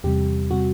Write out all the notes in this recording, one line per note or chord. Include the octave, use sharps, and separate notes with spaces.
E2 C3 G3 G4
C3 G3 F#4